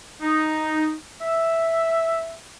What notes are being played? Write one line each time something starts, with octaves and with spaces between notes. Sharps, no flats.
D#4
E5